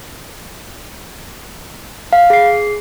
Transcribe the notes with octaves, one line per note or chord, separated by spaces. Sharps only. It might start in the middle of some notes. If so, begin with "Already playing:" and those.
F5
G#4 C7